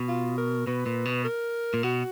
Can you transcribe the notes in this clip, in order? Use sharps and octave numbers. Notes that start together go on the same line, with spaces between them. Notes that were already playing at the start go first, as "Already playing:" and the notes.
Already playing: B2
F4
A#4
B2 B4
A#2
B2
A#4
A#2
B2 F#4